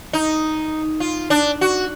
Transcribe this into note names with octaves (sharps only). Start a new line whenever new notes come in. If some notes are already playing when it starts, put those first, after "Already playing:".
D#4
F4
D4
F#4